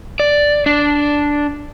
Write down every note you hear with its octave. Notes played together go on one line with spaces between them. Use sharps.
D5
D4